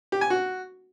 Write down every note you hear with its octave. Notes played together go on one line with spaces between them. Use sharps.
G4
G#5
F#4